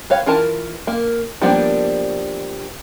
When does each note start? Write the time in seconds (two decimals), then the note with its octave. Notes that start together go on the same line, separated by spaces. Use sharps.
0.10 B4 C#5 F5
0.26 E3 F4 A#4 A5
0.87 A#3
1.42 F3 G3 A#3 B3 D4